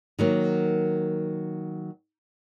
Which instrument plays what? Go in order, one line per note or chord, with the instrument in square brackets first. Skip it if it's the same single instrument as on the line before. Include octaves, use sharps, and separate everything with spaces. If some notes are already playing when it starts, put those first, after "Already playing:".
[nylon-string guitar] D#3 F#3 A#3